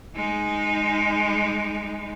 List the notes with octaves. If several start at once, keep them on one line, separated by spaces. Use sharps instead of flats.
G#3 D#4